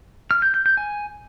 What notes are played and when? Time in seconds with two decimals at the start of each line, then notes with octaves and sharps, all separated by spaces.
0.31 F6
0.42 G6
0.54 G6
0.66 G6
0.77 G#5